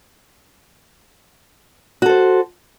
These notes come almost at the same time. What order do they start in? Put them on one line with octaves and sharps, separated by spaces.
F#4 A4 C5